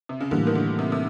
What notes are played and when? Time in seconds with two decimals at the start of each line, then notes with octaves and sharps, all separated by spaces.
0.09 C3
0.21 C#3
0.31 A2 D3 E3 G3 A#3
0.47 D#3
0.55 D3
0.79 C3
0.92 C3